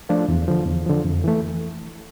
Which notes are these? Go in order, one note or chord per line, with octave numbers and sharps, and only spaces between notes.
F3 A3 D4 F4
E2
D3 F3
E2
D3 F3
F2
E3 A3